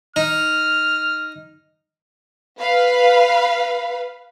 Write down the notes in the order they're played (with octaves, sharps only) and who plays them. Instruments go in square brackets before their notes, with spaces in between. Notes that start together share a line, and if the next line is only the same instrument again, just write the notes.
[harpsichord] D#4 [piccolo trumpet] F6
[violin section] B4 F5 B5